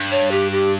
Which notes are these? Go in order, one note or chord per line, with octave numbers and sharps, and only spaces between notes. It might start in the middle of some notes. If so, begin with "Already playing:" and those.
Already playing: G2
C#5
G4
G4